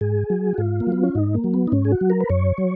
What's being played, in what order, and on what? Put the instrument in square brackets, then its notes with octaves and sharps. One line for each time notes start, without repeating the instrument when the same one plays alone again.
[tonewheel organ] G#2 G#4
F#3
F#4
G#2 F4
A#3
F#3
B3
C#4
G#2 D#4
A#3
F#3
B3
D#4
G#2 C#4
G#4
F#4
F#3
A#4
B4
F#2 C#5
F#3